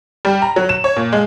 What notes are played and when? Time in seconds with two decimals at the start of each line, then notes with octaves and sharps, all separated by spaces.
0.25 G3
0.42 A#5
0.56 F#3
0.69 E7
0.84 C#5
0.96 A#2
1.13 G#3